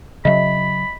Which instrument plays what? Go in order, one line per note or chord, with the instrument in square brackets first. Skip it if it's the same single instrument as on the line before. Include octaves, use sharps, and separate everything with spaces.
[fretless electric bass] C#3 F#3 [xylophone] D#5 E5 [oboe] B5